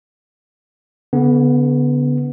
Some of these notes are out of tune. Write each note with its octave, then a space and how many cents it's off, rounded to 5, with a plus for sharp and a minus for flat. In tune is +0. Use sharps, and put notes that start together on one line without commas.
D3 -40 B3 +0